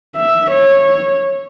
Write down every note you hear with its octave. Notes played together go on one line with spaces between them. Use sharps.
E5
C#5